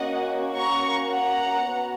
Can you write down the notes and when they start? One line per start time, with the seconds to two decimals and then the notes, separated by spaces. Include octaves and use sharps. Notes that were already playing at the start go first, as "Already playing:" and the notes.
Already playing: A#3 C#4 F#4 D#5 F#5
0.56 A#5 C#6
1.08 F#5 A#5
1.59 B3 F#4